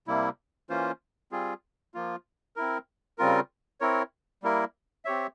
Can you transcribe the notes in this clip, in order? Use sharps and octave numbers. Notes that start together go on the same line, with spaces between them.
C3 G3 A#3 E4
E3 A#3 C#4 F4 C5
G3 C4 F4 G#4
F3 A#3 F4
C4 E4 A#4
C#3 G3 C4 F4 A#4
C4 E4 A#4 C#5
G3 A#3 E4 A#4
C4 G4 C#5 E5